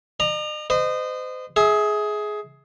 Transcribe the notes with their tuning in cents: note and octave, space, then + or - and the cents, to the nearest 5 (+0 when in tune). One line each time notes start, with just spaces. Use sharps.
D#5 -45 A#5 +0
C5 -35 D#5 -20
G#4 +15 E5 -25